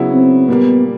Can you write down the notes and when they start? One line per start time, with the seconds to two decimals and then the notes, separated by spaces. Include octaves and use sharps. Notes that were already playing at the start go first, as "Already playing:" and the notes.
Already playing: C#3 F#3 B3 E4
0.13 C4
0.48 A#2 G3 A#3 B3